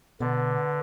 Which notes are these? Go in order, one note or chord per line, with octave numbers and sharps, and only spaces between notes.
B2 D3 B3